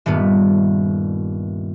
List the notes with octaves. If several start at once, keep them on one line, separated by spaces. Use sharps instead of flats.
D#1 G2 B3